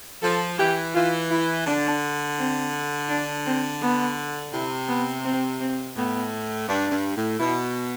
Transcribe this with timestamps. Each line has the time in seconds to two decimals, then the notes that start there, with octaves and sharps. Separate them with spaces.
0.22 F3 A4
0.58 E3 G4
0.94 E3 F4
1.30 E4
1.66 D3 D4
2.38 C4
3.09 D4
3.46 C4
3.81 B3
4.52 C3 E4
4.88 B3
5.24 C4
5.60 C4
5.96 A2 B3
6.68 G2 D4
6.91 G2
7.16 A2
7.39 B2 E4